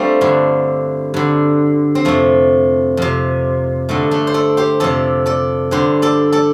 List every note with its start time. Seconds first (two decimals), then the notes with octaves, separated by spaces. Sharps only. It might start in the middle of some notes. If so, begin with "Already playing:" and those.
Already playing: G3 A3 C4 D4 F4
0.21 G2 D3
1.14 G2 D3
1.95 C4
2.05 F2 C3 A3
2.97 F2 C3
3.89 G2 D3 A3
4.11 A3 D4
4.27 C5
4.34 A4 D5
4.57 G4 C5
4.80 F2 C3 A4 D5
5.26 A4 D5
5.71 G2 D3 G4 C5
6.02 A4 D5
6.32 A4 D5